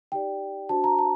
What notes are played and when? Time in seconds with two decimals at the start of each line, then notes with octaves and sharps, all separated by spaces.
0.12 D#4 G4 D5 G5
0.69 D4 F#4 C5 A5
0.84 A#5
0.99 A5